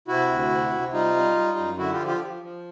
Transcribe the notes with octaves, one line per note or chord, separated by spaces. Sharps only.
C3 E4 F#4
D2
C3
C3
G3 D#4 F4
G3
G3
F#2
D3 E4 F#4
F4 G4
F3
F4 G4
F3
F3